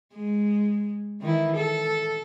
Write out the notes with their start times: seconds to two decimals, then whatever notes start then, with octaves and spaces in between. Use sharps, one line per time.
0.14 G#3
1.21 D#3 E3 E4
1.56 A4